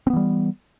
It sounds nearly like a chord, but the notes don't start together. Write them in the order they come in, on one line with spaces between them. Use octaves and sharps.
C4 B3 E3 G3